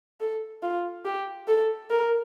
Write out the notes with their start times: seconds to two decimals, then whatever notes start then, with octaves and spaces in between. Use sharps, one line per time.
0.20 A4
0.62 F4
1.05 G4
1.48 A4
1.90 A#4